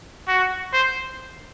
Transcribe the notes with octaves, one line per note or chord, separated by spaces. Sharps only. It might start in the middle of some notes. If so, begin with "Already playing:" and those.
F#4
C5